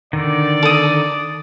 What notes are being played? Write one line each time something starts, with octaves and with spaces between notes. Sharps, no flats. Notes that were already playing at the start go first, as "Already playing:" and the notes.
D3 D#3 D5
A4 D#6